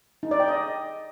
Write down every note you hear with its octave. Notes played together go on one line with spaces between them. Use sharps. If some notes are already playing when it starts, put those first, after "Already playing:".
D#4
D5
G5
D#5